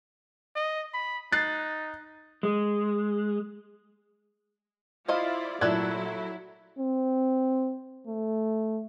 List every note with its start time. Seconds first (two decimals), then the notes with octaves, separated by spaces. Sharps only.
0.56 D#5
0.94 B5
1.32 D#4 F#6 A6 C7
2.43 G#3
5.08 E4 F4 C5 D5 D#5 F5
5.61 A#2 F#3 A3 E4 A4 D5 F#6 G#6
6.79 C4
8.07 A3